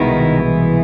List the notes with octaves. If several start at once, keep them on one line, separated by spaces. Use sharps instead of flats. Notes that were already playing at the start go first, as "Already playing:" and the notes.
Already playing: C2 B2 D#3 G#3 B3 E4
E3